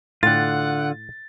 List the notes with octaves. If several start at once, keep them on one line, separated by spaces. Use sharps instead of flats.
A2 D3 F4 F#5 G5 A6